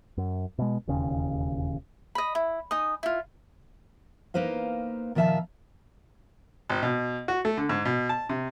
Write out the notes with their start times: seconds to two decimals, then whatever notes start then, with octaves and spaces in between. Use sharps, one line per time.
0.17 F#2
0.59 B2 G#3
0.88 E1 D#2 C#3
2.15 D#5 B5
2.35 E4
2.71 D#4 G#5 D#6
3.03 E4 F4
4.34 A#3 D#4 B4 C5 F5
5.15 A#2 D#3 F3 E5 F5 A5
6.70 G#1
6.83 B2
7.28 F#4
7.45 A3
7.57 D3
7.69 G#2
7.85 B2
8.09 A5
8.29 C3